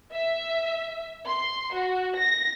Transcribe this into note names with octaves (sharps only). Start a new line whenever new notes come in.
E5
C6
F#4
A#6